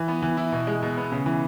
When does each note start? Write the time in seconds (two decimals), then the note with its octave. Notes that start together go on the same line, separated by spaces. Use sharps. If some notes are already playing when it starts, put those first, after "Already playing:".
Already playing: E3
0.08 B3
0.22 E3
0.37 E4
0.52 B2
0.67 G#3
0.83 B2
0.97 B3
1.12 C#3
1.26 E3